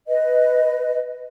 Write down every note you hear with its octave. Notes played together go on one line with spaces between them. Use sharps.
B4 D#5